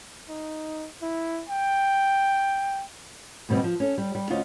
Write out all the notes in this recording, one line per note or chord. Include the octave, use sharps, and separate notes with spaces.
D#4
E4
G5
D#2 B2 G3 C4 D#5
F3
C#4 A4
G3
G3
D2 C#4 F4 C5 D#5